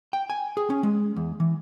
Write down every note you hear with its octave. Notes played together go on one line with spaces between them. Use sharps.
G5
G#5
G#4
C#4
G#3
E2
E3